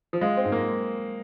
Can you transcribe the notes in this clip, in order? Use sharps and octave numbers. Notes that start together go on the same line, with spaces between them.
F3
G#3 F4
C4
G#2
A#3